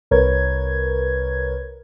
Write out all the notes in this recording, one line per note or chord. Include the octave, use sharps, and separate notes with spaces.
C2 A#4 B4 C#5 G#6